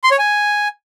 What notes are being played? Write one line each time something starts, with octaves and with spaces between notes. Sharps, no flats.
C6
C#5
G#5